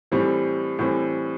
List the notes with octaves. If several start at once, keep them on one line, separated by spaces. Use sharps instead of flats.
A2 E3 G3 C4
A2 E3 G3 C4